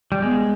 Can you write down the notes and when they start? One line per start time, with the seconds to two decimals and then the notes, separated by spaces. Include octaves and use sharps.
0.12 G3
0.22 G#3 B3